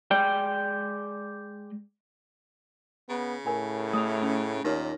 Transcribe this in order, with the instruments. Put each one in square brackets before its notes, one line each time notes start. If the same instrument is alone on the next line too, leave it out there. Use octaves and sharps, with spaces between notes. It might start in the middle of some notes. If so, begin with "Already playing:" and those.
[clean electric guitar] G#3 D5 G5
[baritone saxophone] C#3 [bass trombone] B3
[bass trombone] A2 [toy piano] A#4 G#5 B5
[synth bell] A3 E5 F7 [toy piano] D#6
[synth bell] C#4
[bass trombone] D#2 [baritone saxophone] A#2 [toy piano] D#4 G4 A#4 [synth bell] C#5 F6 A#6